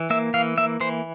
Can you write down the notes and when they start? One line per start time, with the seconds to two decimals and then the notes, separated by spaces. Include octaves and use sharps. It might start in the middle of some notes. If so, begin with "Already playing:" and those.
Already playing: E3
0.10 A#3 E5
0.34 E3 F5
0.58 A#3 E5
0.80 E3 C5